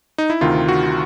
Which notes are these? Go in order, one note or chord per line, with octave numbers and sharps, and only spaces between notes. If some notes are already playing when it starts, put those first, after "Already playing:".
D#4
E4
D2 C3 D#3 F4
F#4